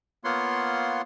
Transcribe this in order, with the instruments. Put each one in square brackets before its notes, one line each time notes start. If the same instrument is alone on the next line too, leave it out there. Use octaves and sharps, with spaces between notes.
[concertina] A#3 B3 F4 C#5 F#5 C6